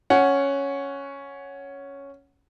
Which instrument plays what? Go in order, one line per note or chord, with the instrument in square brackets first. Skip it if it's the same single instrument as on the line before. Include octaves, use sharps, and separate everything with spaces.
[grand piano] C#4 F#5